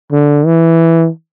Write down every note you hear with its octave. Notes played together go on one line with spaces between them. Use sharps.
D3
E3